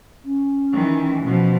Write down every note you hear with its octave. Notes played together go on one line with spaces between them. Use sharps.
C#4
D#3 E3
B2 F3